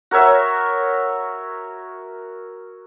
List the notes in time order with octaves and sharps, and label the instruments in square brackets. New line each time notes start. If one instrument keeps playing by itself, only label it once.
[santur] F#4 A#4 C#5 E5